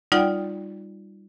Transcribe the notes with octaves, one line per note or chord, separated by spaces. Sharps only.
G3 D#4 F4 D5 F#5 G5